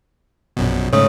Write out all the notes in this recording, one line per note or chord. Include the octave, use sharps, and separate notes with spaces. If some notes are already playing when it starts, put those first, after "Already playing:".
A#1 F#2 B2
G#2 C#3 A3 C#5 D#6